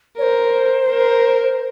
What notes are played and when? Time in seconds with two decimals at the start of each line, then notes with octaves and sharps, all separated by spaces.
0.18 A#4 C5 C#5
0.90 A#4